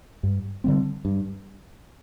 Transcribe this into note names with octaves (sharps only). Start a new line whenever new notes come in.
G2
D3 G3 C4
G2